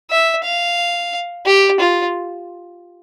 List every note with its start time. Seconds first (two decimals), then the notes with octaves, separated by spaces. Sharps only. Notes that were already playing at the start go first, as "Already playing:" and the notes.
0.11 E5
0.45 F5
1.46 G4
1.80 F4